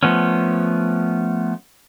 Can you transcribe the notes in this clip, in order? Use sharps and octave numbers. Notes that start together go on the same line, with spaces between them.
F3 A3 B3 C#4